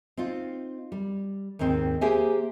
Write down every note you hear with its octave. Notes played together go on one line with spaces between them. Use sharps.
C4 D#4 F4
G3
D#2 G#2 D#3 C4
A#3 G4 G#4 C5 E5 G#5